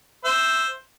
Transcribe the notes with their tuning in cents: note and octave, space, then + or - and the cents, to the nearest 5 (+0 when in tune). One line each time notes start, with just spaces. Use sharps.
C5 +0 E5 +0